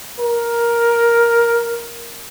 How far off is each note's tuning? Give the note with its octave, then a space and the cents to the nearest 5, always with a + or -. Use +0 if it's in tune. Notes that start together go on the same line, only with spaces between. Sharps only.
A#4 +10